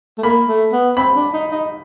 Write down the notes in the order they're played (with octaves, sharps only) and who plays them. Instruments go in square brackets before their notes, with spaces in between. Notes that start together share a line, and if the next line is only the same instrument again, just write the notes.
[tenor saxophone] A3
[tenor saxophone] A#3 [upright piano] B5
[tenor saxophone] A3
B3
[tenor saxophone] C4 [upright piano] B5
[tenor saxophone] D4
D#4
D#4